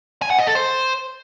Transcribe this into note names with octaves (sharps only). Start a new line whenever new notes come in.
G#5
F#5
D#5
A4
C5